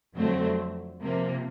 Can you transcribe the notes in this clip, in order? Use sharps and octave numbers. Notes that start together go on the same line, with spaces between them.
F2 D3 F#3 A3 C4
C3 F3 A#3